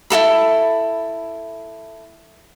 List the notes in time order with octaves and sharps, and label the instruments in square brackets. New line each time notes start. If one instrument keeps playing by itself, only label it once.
[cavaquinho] E4 F4 A4 B5